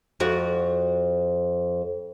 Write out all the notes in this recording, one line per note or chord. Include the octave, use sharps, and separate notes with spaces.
F2 F#4